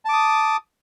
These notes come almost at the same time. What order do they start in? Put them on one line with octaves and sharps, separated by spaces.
A5 D6 D#6